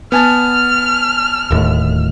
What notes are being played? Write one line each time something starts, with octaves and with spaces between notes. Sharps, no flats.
B3 G#5 A5 F6
D1 D#2 A2